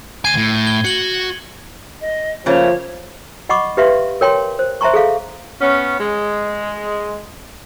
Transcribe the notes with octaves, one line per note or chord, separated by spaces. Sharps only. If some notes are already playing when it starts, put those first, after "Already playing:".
D2 G#5 G#6 C7 D#7
A2
G#6 G7
F#4 C#7 F#7 G7
D#5
C#3 F3 A3 A#3 C#5
D#5 F#5 B5 C#6 D6
G4 B4 E5 F5 C6
A#4 C#5 G5 A5 C6
C5
C5 E5 A5 A#5 C6 C#6
G#4 A4 F5
B3 C#4
G#3